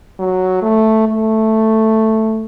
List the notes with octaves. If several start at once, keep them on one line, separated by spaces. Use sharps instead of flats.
F#3
A3
A3